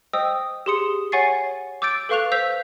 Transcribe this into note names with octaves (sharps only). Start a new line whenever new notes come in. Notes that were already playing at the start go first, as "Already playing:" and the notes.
C5 D#5 G5 D#6 E6
G4 G#4 C6 D#6 C#7
C#5 F#5 G#5 C#6 A6 C7
D6 E6 G6 A6 D7
A4 B4 F5 C#6 F#6 F7
C5 F5 E6 G6 B6 F7